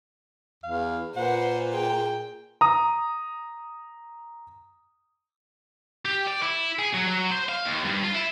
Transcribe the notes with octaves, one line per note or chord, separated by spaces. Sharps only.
E2 F5
A#2 B4 C5 F#5
G#4 G5
A#5 D#6
G4
D5
E4
G#4
F#3
F#3
C5
F5
D#2
G2
F4
E4